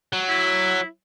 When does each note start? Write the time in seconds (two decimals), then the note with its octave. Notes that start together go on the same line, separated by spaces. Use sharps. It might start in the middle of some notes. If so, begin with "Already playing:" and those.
0.13 F#3
0.29 E4